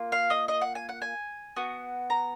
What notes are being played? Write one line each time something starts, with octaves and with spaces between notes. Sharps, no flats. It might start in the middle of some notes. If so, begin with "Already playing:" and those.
Already playing: A#3 F4
F5
D#5
D#5
F#5
G#5
F#5
G#5
B3 F#4
A#5